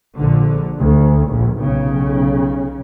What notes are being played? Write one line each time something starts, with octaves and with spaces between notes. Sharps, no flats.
A#1 D3
D2
A#1
B1 C#3